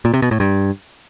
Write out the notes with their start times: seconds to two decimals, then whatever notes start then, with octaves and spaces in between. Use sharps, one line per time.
0.05 A#2
0.14 C3
0.22 B2
0.31 A2
0.40 G2